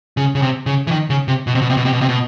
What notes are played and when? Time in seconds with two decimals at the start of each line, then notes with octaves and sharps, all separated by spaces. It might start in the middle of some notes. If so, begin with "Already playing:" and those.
0.17 C#3
0.35 C#3
0.42 C3
0.66 C#3
0.87 E3
0.91 D#3
1.10 C#3
1.28 C3
1.47 B2
1.55 C3
1.62 B2
1.70 C3
1.77 B2
1.85 C3
1.93 B2
2.01 C3
2.09 B2